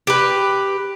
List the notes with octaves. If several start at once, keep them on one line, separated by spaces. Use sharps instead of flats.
G4 B4